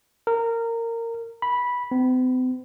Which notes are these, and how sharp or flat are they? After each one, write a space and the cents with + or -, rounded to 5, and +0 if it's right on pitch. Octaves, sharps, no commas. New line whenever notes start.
A#4 -20
B5 -10
C4 -45